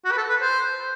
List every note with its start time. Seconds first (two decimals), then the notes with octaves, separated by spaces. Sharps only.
0.05 F#4
0.12 B4
0.17 A4
0.29 B4
0.42 C5